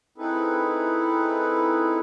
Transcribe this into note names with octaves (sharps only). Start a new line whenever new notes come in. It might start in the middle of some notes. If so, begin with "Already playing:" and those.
C4 D#4 E4 G#4 A4 B4